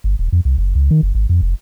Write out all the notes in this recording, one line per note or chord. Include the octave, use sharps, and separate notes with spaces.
G1
D#1
F2
C2
F#1
C#2
D#3
F#1
G#1
F2
F1